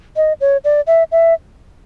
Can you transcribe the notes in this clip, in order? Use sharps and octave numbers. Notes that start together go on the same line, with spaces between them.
D#5
C#5
D5
E5
E5